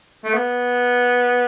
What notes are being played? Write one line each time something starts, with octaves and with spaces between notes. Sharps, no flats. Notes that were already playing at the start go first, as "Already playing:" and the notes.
A3
B3